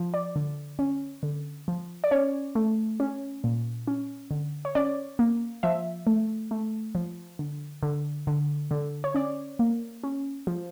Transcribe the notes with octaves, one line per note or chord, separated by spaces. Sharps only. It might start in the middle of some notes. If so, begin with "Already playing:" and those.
Already playing: F3
D5
D3
C#4
D3
F3
D5
C#4 C#5
A3
C#4
A#2
C#4
D3
C#5
C#4 D5
A#3
F3 E5
A3
A3
F3
D3
D3
D3
D3
C#5
C#4 D5
A#3
C#4
F3